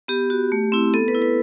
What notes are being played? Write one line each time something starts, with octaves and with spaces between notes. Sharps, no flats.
B3 G4
F#4
A3
C4 E4
B3 A4
B4
E4
B4